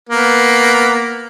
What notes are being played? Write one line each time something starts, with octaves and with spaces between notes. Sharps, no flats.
A#3 B3